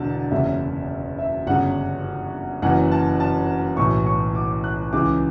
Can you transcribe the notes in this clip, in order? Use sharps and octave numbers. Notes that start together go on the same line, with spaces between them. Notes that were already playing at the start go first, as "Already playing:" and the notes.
Already playing: E1 E2 D3 A5
F#1 E2 C#3 E5
E5
G1 F#2 C#3 F#5
F#1 F#2 E3 F#5
A5
A5
B1 A2 E3 C#6
C#6
D6
F#6
C#2 C#3 E3 D6